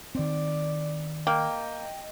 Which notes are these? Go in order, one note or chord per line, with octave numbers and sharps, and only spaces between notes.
D#3 C4 D5
A#3 D#5 G5